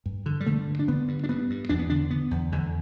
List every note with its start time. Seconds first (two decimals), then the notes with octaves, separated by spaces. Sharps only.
0.06 G2
0.26 D3
0.40 G3
0.46 D3 A3
0.68 G2
0.79 D4
0.88 D3 B3
1.08 G2
1.24 D4
1.29 G2 B3
1.50 G2
1.69 E2 D4
1.79 B3
1.90 D3 D4
2.10 D3 B3
2.31 E2
2.52 E2 D3